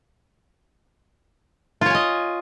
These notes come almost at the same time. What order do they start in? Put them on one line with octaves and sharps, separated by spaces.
F4 C#5 G#5 D#5